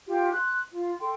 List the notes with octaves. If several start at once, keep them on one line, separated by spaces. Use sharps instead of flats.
F4 G4
C6 F#6
F4
A4 G5 C6